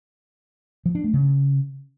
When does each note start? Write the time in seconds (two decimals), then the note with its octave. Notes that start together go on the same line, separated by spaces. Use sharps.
0.86 F3
0.95 D4
1.04 A3
1.14 C#3